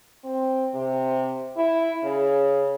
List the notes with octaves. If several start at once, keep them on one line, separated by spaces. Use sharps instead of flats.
C4
C3
E4
C#3